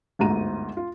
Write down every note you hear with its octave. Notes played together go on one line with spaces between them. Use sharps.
G1 D2 G#2 A#5 D#7
F4